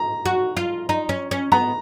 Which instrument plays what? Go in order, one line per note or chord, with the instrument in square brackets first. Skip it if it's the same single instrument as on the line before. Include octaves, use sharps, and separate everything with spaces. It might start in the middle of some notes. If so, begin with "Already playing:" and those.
Already playing: [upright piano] A#5
[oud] F#4
F4
D#4
C#4
C#4
[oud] B3 [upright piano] A#5